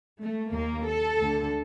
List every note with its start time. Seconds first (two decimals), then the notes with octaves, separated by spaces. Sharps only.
0.20 A3
0.53 D#2 D#3 A#3
0.87 A4
1.21 D2 D3